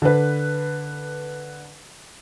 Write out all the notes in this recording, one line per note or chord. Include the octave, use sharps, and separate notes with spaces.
D3 B4